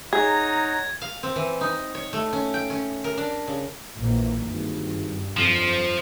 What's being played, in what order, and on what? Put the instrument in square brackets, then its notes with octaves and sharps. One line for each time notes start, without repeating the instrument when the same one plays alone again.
[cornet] D#4 [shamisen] G#4 [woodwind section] C#5 F#5 A#5 [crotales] G#6
[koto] F5
C4
E3
D#4
C#5
A3
C#4
G5
C#4
A#4
D4
C#3
[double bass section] A#1 E3 A#3
[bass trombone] G#1 [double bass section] G2
[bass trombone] F2 [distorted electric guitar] F3